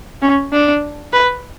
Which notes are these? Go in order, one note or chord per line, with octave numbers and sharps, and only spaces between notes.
C#4
D4
B4